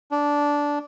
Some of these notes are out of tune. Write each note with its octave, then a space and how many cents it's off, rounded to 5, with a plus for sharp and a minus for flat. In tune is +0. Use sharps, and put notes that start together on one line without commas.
D4 -10